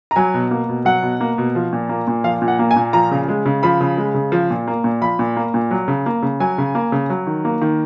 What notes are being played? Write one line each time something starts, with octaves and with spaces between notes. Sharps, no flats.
A#5
F#3 G#5
B2
A#3
B2
F#3 F#5
B2
A#3
B2
F3
A#2
A#3
A#2
F3 F5
A#2
F#5
A#3
G#5
A#2
F3 A#5
C#3
G#3
C#3
F3 B5
C#3
G#3
C#3
F3
A#2
A#3
A#2
F3 B5
A#2
A#3
A#2
F#3
C#3
A#3
C#3
F#3 G#5
C#3
A#3
C#3
F#3
D#3
A#3
D#3